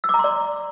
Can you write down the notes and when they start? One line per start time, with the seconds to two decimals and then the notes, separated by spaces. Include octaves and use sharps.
0.04 E6
0.09 D6
0.14 A#5
0.19 C6
0.24 D5